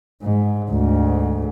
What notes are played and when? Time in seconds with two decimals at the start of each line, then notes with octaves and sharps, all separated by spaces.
0.23 G#2
0.71 D2 G#2